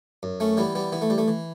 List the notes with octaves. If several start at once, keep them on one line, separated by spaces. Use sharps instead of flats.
F#2
A3 C#4
E3 G3 B3
G3 B3
E3 B3
A3
G3
A3
E3